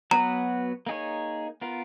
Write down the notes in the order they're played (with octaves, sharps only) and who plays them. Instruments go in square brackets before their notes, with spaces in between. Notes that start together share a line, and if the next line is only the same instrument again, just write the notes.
[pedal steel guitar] F#3 B3 F#4 B4 [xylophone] A#5
[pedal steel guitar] A#3 D#4 G#4 C#5
B3 F4 A#4